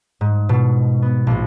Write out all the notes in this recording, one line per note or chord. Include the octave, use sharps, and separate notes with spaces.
G#2
B2
B3
A#1